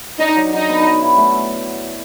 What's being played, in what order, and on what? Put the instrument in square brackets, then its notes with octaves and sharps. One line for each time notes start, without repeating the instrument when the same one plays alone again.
[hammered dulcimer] D4 [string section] D#4
[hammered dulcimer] F#3
[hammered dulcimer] F#3 [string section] D#4
[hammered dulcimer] B3
F#3
E4
A3